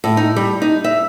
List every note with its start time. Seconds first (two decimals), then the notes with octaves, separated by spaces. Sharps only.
0.04 A2
0.17 D#4
0.36 G3
0.62 D#4
0.84 E5